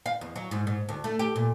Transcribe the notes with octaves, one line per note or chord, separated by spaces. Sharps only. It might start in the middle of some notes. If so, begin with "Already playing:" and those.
F5
E2
F#3
G#2
G#2
D2
A3
G4
A#2